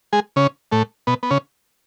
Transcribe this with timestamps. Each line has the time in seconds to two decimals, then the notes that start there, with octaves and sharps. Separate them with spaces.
0.13 G#3 G#4
0.36 C#3 C#4
0.72 A2 A3
1.07 B2 B3
1.23 B3
1.31 C#3 C#4